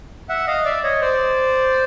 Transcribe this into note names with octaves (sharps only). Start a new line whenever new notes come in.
E5 F#5
D#5 F5
D5 E5
C#5 D#5
C5 D5